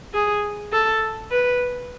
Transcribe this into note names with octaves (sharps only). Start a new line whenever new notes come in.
G#4
A4
B4